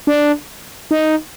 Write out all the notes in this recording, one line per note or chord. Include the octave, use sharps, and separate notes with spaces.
D4
D#4